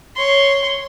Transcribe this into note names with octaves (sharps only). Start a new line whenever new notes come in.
C#5 C6